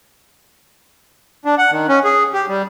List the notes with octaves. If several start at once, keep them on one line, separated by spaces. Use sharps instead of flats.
D4
F#5
D#3
C#4
G#4
G4
G3